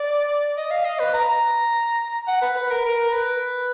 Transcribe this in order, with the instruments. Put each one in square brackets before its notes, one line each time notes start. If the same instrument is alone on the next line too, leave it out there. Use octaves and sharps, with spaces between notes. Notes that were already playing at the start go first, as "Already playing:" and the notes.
Already playing: [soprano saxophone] D5
D#5
F5
D#5
B4
A#5
F#5
B4
B4
A#4
A#4
B4